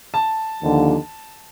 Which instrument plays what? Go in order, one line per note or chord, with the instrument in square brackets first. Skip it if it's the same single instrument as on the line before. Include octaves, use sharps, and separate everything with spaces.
[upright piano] A5
[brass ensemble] D#2 D3 F3